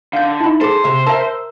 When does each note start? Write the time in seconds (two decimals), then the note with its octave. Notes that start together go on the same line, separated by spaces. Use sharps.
0.13 D3 F5 G6
0.40 D#4 E4 A5 B5
0.61 G#4 A4 C5 D6 C7
0.84 C3 E5
1.07 A#4 E5 A5 E6